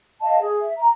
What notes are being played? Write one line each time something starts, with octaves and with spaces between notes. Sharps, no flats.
D#5 F5 A5
G#4
E5
A#5